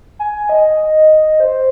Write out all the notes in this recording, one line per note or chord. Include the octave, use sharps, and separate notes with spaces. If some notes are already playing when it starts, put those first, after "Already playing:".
G#5
D#5
C5